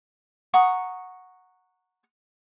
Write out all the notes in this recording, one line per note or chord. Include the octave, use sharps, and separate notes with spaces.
F#5 A#5 C#6 D#6